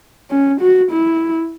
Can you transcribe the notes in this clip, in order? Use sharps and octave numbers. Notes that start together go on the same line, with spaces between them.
C#4
F#4
E4